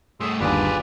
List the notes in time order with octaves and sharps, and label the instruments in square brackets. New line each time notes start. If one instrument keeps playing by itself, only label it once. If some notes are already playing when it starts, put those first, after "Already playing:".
[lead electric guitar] G2 A3 [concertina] G#4 C6 E6
[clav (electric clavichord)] G1 D#2 D4 [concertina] F4 B4 D5 [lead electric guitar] G4 G#4